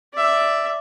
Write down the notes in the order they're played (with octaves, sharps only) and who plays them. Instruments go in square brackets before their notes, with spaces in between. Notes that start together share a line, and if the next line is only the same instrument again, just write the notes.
[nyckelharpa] D5 E5